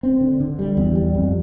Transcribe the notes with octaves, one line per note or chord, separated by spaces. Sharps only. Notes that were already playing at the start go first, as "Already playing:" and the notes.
C4
D3
D3
G3
E2
G3
F2